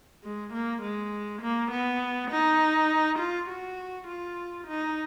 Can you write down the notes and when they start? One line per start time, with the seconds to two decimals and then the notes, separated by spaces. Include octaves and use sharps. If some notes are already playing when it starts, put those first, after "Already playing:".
0.24 G#3
0.53 A#3
0.82 G#3
1.42 A#3
1.71 B3
2.31 D#4
3.19 F4
3.49 F#4
4.07 F4
4.68 D#4